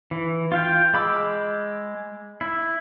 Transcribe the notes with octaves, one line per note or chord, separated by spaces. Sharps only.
E3
F4 F5 G5
G#3 B5 D6 E6
E4